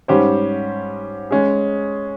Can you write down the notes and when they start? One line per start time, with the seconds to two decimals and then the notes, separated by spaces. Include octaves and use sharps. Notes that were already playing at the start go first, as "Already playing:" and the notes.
0.08 G#2 G3 C#4 G4 C5
1.31 G#3 C#4 G#4